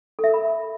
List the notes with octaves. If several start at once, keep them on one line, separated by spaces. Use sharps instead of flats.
A4
E5
A#4
B5